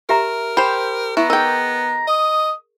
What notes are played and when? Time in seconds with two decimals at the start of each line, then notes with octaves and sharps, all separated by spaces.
0.09 G4 A#4 E5 A#5
0.57 G4 C5 B5
1.17 B3 E4 A#5 C#6
1.30 D#4 G#4 A#4 G5
2.08 D#5 D#6